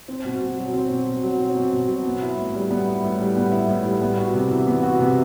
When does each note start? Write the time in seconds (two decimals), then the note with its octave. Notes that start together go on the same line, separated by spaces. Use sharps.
0.08 C4
0.25 B2
0.42 B2
0.58 F#3
0.73 C4
0.90 B2
1.06 B2
1.23 F#3
1.40 C4
1.55 B2
1.73 B2
1.88 F#3
2.06 B3
2.22 E4
2.37 A2
2.55 G3
2.71 B3
2.87 E4
3.04 A2
3.20 G3
3.37 B3
3.52 E4
3.68 A2
3.86 G3
4.01 B3
4.17 F#4
4.34 C3
4.51 E3
4.67 B3
4.83 F#4
5.00 C3